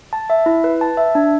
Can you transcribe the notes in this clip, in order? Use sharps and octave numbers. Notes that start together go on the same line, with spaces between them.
A5
E5
E4
B4
A5
E5
D4